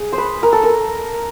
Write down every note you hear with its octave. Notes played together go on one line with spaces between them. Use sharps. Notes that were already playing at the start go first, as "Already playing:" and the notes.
Already playing: G#4
C5
B4
A#4
A4
A#4